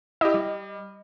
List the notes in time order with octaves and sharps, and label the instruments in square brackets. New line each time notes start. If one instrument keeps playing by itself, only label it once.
[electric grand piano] E4 G4 [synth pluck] D#5
[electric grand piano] G3